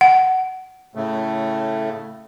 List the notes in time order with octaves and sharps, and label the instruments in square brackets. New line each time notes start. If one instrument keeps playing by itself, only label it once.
[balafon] F#5
[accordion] A2 C#3 A3